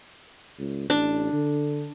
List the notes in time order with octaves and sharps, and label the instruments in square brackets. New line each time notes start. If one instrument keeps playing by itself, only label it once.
[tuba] C#2
[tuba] A1 [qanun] D4
[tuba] D3